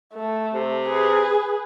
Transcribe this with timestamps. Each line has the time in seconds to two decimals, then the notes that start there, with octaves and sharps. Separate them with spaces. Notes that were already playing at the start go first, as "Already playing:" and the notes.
0.14 A3
0.54 C3
0.86 G#4 B4